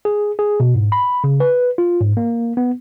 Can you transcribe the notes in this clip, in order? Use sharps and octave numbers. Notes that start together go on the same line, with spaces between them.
G#4
G#4
B2
G#2
B5
C#3
B4
F4
G#2
A#3
B3